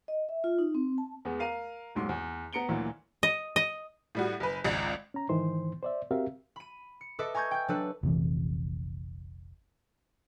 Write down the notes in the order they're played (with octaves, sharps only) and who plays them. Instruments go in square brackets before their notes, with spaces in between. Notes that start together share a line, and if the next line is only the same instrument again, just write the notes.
[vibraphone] D#5
E5
F4
D#4
C4
A5
[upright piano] E2 G#3 B3
A#4 F5 D#7
D#1 B1 G#2 C6
E2
B3 A#5 C#7 D7 G7
D2 A#2 E3 F#3
[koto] D#5
D#5
[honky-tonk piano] A2 G3 F#4
F#1 B4
G#1 C#2 D5
[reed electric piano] C#4 A#5
G#2 D#3 E3 C5 C6
C5 D5 E5
C4 F#4 G4 A#4 E5 F5
[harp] B5 D#7
C#7
A4 B4 D#5 E5 D6
G#5 A#5 C#6 G6 G#6
G5 G6
F#3 D4 A4 B4
[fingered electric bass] F1 A#1 C3 E3